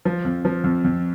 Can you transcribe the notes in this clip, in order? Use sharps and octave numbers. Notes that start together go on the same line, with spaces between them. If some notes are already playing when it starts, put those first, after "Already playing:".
F3
F2
F3
F2
F2